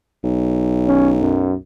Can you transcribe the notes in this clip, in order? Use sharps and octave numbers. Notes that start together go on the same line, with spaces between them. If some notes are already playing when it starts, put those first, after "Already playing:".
B1
C#4
F#2